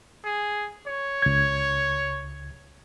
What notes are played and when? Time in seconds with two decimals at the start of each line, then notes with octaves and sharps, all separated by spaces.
0.24 G#4
0.86 C#5
1.22 C#2 G#6